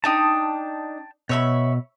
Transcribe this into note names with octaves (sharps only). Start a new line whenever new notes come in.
D4 D#4 G5 A5 D#6
B2 C#5 E5 B5